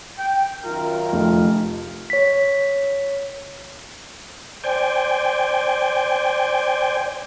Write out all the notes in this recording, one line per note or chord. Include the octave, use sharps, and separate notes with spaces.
G5
F#2 D#3 F4 A#4
F1 F2
C#5 B6
C5 D5 G5 G#5